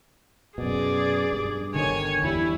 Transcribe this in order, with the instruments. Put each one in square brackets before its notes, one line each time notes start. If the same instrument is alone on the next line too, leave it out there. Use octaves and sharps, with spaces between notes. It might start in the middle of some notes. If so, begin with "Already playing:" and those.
[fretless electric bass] F#2 B2 [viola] G#4 D5
[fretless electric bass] G2
[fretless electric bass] G1 D3 D#3 [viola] C#5 G#5
[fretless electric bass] E2 G3 [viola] E4